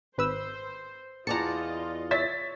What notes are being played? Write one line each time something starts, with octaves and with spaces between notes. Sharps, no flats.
G#1 B4 C5 E6
E2 F4 D5 D#5 A5 A#5 C#7
C#5 E5 A6 B6